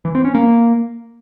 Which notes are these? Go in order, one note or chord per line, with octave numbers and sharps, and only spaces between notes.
E3
C4
C#4
A#3